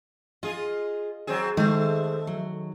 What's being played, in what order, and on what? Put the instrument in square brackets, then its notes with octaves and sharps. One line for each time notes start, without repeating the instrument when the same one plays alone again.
[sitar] F4 G#4 [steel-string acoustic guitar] D#5
[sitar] F#3 C4 G#4
[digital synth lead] D#3 [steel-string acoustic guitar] G#3 C5 [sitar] A3 [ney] A4
[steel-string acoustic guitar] F#3